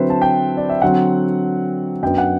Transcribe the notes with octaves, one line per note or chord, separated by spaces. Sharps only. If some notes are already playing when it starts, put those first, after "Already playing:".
Already playing: D3 F#3 C4 E4 B4 C5
A5
G5
D5
E5
D3 F#3 C4 F#5
F#2 F#3 B3 D4 G5
F#5